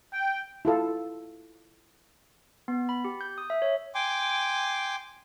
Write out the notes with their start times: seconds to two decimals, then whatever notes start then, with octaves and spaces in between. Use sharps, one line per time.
0.12 G5
0.65 E4 F4 A4 F5
2.68 B3
2.89 B5
3.05 G4
3.21 G6
3.38 D#6
3.50 E5
3.62 C#5
3.95 G5 G#5 C6 D6